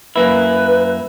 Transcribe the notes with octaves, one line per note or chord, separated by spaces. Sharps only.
F#2 A#3 E4 B4